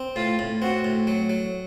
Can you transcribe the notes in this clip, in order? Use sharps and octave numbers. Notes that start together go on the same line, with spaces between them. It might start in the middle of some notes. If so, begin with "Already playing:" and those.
Already playing: C4
A2 F4
A2
C4 F#4
A2
F#3
F#3